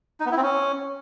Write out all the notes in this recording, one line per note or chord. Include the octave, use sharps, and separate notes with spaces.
D#4
B3
E4
C4
C#4